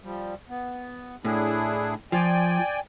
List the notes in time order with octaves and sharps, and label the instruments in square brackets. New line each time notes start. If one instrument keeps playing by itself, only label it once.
[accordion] F3 G3
B3
[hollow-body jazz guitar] A2 [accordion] D4 E4 G#4
[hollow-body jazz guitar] F3 [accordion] D5 G5 G#5